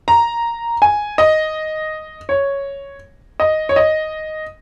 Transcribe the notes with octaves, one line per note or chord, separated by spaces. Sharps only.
A#5
G#5
D#5
C#5
D#5
C#5
D#5